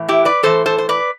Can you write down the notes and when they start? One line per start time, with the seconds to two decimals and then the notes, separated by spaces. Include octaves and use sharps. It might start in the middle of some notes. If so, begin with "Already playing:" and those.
Already playing: A2 E3
0.08 E4 G4
0.25 B4 D5
0.43 A2 E3 A4 C5
0.66 A4 C5
0.78 C5
0.89 B4 D5